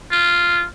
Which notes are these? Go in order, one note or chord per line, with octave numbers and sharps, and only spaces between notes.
F4